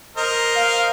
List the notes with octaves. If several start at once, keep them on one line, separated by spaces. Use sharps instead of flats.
A#4 C5 D#5
F5